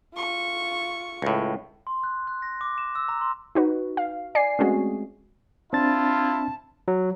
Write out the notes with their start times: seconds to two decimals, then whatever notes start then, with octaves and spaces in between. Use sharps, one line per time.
0.15 F4 C#6
1.22 C#2 A2
1.87 C6
2.04 F#6
2.27 F#6
2.42 A#6
2.61 D6
2.78 E7
2.95 E6
3.09 A#5
3.21 C6
3.55 D#4 F#4 B4
3.97 F5
4.35 D5 G#5 C7
4.59 G#3 A3 C4 C#4 F#4 G#4
5.73 C4 D4 E4 F4 A5 A6
6.88 F#3